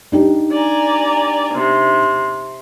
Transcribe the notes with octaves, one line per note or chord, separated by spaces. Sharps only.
D4 D#4 G4
D5 G#5 A#5
C3